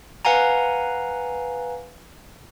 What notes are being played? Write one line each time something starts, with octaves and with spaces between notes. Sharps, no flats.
B4 F5 F#5 G#5 A#5